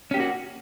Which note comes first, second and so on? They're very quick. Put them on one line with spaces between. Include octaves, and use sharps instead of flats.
C#4 G4 A#3 F#4